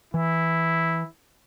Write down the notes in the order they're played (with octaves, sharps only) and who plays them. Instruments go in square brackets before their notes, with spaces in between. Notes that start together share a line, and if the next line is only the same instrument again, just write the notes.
[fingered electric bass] E3 [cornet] E4